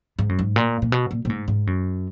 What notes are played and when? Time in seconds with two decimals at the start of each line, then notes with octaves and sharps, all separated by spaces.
0.19 G#2
0.29 F#2
0.39 G#2
0.56 A#2
0.82 A#2
0.92 B2
1.11 A#2
1.25 A#2
1.30 G#2
1.48 G#2
1.67 F#2